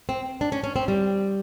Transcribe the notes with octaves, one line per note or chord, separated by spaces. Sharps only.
C4
D4
C#4
C#4
C4
G3